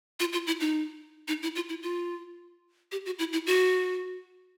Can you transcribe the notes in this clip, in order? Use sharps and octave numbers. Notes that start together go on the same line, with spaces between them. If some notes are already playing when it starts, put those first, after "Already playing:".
F4
F4
E4
D#4
D#4
E4
F4
E4
F4
G4
F#4
E4
E4
F#4